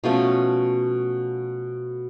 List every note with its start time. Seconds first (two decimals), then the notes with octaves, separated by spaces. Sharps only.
0.04 B2 F3 A3 C#4